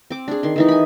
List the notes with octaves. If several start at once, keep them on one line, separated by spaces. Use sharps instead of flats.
C4 D6
D4 G#4
D#3 C6
D#3 E3 D#4
G#5 B5